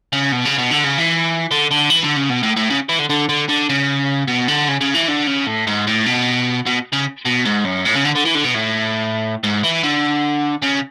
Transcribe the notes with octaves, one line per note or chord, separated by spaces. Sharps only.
C#3
B2
C#3
B2
D3
C#3
E3
D3
D3
E3
D3
C#3
B2
A2
A2
C#3
E3
D3
D3
D3
D3
C#3
B2
D3
C#3
C#3
E3
D3
C#3
A2
G#2
A2
B2
B2
C#3
B2
G#2
F#2
A2
C#3
D3
D3
E3
D3
B2
A2
G#2
E3
D3
C#3